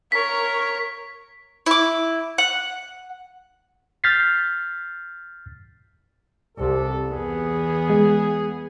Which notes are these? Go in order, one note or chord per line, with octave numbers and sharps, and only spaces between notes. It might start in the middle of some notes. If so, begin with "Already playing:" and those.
A#4 C#5 B6
E4 D6
F#5
F6 G6 A6 B6 C7
C2 C3 A4
E2 B3 G#4
G#3